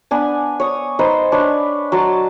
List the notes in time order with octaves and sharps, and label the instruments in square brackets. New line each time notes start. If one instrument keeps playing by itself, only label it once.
[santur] B3 D4 G#5
C#5 D#6
D#4 B4 C5
D4 B4 C#5
F#3 A5 C6